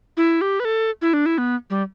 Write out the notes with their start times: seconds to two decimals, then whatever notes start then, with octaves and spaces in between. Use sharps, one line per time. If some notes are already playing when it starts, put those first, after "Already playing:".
0.17 E4
0.41 G4
0.60 B4
0.65 A4
1.02 E4
1.13 D4
1.26 E4
1.38 B3
1.70 G3